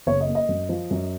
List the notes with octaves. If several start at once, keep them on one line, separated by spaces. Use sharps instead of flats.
F#1 C#5
D#5
A#3
D#5
F#2
F3
F#2